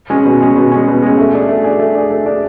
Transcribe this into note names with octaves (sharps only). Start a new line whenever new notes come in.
G#3 C#4
B2
G#3 C#4
B2
G#3 C#4
B2
G#3 C#4
A3
D4 G#4
A3
D4 G#4
A3
D4 G#4
A3
D4 G#4